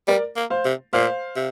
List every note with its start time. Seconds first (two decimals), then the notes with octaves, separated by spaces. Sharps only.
0.08 G3 A#4 D5
0.36 A#3
0.50 C5 F5
0.65 C3
0.93 A#2 C5 F5
1.36 C3